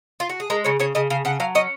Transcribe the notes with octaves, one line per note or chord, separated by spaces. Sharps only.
F4
F#4
G#4
G#3 A#4
C#3 C#5
C#3 C#5
C#3 D#5
C#3 F5
C#3 F#5
F#3 F5
C#4 D#5